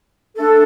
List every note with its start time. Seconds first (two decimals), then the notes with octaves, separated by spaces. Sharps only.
0.37 A3 D4 A4